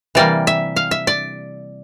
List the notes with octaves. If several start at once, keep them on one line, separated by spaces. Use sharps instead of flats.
C3 E3 G3 A#3 D5
E5
F5
E5
D5